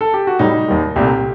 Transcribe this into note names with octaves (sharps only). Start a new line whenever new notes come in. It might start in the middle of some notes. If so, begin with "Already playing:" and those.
A4
G4
F#4
A2 G3 D#4
D#2 D#3 G3
C2 A#2 A3 G4